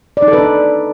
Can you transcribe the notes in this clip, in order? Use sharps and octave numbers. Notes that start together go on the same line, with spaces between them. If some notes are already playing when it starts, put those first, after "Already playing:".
D5
D#4
A4
B4
D4